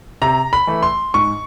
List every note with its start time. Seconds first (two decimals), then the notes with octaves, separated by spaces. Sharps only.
0.22 C3 A#5
0.53 B5
0.67 E3 A3
0.83 C6
1.14 G#2 C#6